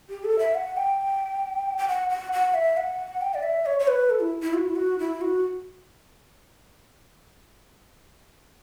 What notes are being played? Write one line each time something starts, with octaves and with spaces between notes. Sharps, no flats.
G4
A4
E5
F#5
G5
G5
F#5
F#5
F#5
E5
F#5
G5
D5
E5
C#5
C#5
B4
A4
E4
E4
F#4
E4
F#4
E4
F#4